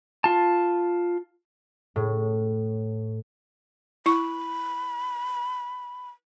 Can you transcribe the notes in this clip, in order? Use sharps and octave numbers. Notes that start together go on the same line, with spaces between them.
F4 A5
A2
E4 B5 C#6